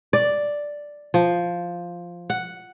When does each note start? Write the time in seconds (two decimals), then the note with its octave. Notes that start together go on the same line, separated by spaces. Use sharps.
0.13 D5
1.14 F3
2.30 F#5